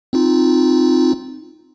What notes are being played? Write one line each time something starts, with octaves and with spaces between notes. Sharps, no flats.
C4 D#4 F4